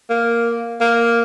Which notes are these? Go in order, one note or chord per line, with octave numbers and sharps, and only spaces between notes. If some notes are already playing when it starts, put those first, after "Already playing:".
A#3
A#3